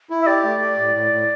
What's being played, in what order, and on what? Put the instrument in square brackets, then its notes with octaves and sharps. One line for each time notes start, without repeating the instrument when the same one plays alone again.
[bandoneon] E4
[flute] E5
[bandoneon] G4 [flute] D5
[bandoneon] A3
G4
A2
A2
A2